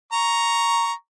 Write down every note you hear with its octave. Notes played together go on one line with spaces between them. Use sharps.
A#5 C#6